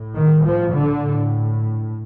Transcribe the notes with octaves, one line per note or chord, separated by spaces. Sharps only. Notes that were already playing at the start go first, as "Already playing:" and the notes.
Already playing: A2
D#3
F3
D3
A2